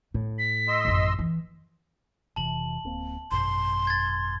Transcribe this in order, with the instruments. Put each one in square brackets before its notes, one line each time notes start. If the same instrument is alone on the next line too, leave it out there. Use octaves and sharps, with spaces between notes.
[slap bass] A2 [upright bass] A3
[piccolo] B6
[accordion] D#5 C6 E6
[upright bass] A1 F#2
E3
[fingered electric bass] F1 C3 E3 [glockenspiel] A5 F#7
[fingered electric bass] D1 A#3 C4
[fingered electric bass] G#1 F#2 B2 [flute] C6
[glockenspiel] G#6 A6